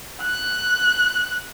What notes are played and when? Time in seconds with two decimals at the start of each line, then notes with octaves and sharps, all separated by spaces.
0.21 F#6